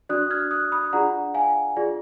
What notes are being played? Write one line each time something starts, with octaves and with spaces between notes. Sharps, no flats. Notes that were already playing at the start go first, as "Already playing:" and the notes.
D4 F#4 D5 D#6 F#6
F6 G#6
D#6 F#6
B5 D#6
D4 F4 G#4 D5 F#5 A#5
F5 G#5
F4 G#4 D5